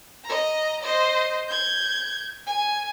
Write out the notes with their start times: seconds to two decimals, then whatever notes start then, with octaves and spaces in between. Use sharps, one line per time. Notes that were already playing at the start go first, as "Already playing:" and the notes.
0.25 D#5 A#5
0.83 C5 D#5
1.48 G6 G#6
2.47 G#5